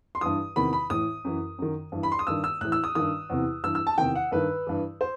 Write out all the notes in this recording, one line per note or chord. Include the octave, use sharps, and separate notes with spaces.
C6
G2 E3 D#6
E2 C3 D#3 B5
B5
A2 E3 D#6
F#2 E3
F#2 D#3
G2 E3
B5
C6
D#6
G2 D#3 E6
E6
A2 E3 F#6
E6
D#6
G2 D#3 D#6
E2 C3 E3
G2 E3 E6
E6
A5
E2 C3 D#3 G5
F#5
G2 D#3 B4
G2 E3
C5